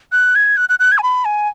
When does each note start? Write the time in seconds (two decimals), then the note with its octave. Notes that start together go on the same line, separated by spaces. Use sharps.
0.12 F#6
0.35 G#6
0.57 F#6
0.69 F#6
0.79 F#6
0.92 G#6
0.98 G#5
1.03 B5
1.25 G#5